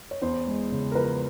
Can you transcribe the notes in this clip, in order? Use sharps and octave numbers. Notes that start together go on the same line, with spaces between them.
C#5
E2 C5
G#3
C#3
A#4
F3 B4